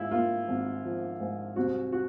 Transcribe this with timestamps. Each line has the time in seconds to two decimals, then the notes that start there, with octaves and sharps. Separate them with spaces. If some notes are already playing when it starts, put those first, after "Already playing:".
Already playing: G#2 E4 F4
0.11 A#3 F4
0.48 G#1
0.84 F3
1.20 G#2
1.56 C2 F#4
1.92 F#4